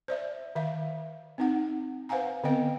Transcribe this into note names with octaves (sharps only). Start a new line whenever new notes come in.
C5 D5 E5
D#3 E5 F5
C4 D#4 F#5
B4 C5 F5 F#5 G#5 A#5
D3 B3 C4 B4 D#5 G5